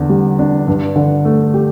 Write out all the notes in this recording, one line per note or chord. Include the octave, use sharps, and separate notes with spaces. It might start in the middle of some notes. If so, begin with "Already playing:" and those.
Already playing: E2 D3
G3
D4
G2
D3
A3
G4